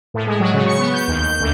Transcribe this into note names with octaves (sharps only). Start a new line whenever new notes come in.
A2
G#3
F#3
C#3
C#6
B3
G6
D#2
G6
D2